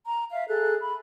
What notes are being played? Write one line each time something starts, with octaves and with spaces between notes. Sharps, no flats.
A#5
E5 F5
G#4 A4 F#6
B5